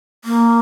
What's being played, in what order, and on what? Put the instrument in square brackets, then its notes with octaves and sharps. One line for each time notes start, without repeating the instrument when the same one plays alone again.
[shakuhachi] A#3